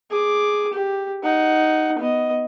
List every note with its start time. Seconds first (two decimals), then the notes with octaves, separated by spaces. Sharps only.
0.10 G#4 D6
0.73 G4
1.23 D#4 F#5
1.98 B3 D#5